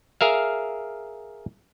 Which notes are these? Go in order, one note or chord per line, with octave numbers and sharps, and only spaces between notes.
G#4 A#4 E5 F5